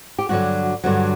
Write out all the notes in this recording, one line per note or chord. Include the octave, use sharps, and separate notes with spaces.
G4
G2 D3 F#3 F#4
G2 D3 F#3